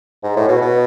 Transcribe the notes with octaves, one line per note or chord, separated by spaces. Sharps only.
G#2
A2
B2
B2